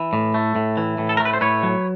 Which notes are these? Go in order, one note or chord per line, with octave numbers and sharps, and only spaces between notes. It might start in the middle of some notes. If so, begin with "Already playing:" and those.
Already playing: E3
A2
A3
A2
E3
A2
A4
A3 A#4
B4
C5
A2 B4 C#5
F#3